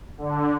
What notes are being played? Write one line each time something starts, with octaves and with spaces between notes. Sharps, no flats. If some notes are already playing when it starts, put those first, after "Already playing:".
D3